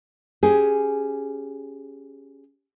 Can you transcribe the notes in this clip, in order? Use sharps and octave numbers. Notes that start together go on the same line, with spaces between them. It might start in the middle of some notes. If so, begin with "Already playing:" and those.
C#4 G4 G#4